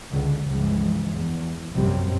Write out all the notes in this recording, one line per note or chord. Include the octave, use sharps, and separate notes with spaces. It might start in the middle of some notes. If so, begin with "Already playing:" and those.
C#2 D3 G#3
C#2 G2 C#3 E3 F3 G#3
E2
A#1 F#2 C3 F#3 G3 C4